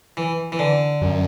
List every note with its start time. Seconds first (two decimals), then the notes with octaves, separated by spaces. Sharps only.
0.17 E3
0.52 E3
0.59 D3
1.02 F#2